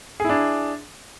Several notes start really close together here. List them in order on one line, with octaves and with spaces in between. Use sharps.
G#4 E4 D4